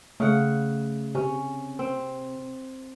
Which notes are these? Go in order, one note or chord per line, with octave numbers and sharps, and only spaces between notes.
C#3 A3 F#5
C3 C#4
C4